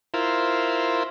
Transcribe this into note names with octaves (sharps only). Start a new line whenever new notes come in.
E4 F4 A#4 C5